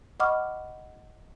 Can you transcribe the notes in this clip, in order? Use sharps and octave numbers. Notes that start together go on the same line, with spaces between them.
D#5 F#5 B5 C#6 D6 F6